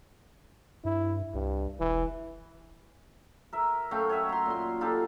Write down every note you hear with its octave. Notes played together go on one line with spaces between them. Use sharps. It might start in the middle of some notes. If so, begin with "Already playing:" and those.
G2 E4
C2 G2
E1 E3
A#4 E5
F#2 A3 F5 G5
C#5 D#5 E5 F#5
A#5 C6
A#2 C6
D#4 F4 G4 A4